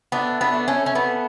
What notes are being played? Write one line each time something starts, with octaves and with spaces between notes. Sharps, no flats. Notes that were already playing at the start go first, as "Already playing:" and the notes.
A3 B3 D4
B3 D4
A3
A3 C#4
C#4
A3 B3